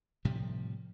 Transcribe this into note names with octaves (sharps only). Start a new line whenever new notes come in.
A2 C3 F3 G3